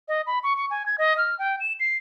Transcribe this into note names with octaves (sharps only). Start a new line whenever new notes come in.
D#5
B5
C#6
C#6
G#5
G#6
D#5
F6
G5
E7
C7